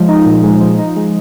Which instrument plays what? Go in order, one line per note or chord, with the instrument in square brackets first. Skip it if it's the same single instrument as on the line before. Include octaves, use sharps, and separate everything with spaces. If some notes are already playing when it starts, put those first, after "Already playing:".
Already playing: [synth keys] F3 G#3
D#4
A#2
G#3
F3
D#4
G#3